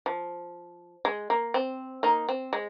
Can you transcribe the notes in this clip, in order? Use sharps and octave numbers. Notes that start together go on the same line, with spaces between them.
F3
G#3
A#3
C4
A#3 D#4
C4
G#3